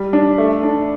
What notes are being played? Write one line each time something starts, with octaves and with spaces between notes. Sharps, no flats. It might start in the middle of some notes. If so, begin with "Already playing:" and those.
Already playing: G3
D4
A3
D4